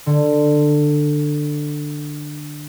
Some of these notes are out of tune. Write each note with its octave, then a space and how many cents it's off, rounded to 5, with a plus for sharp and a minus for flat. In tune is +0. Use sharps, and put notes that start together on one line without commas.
D3 +15